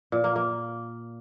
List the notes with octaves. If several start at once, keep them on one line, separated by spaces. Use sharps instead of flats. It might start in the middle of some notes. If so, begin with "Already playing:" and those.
A#2
A#3
A#3